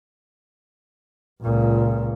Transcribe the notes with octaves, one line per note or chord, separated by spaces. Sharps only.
C#2 A#2